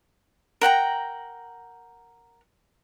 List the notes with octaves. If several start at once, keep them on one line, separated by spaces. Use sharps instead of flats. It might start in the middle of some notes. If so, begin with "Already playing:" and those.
A#4 F#5 G5 A#5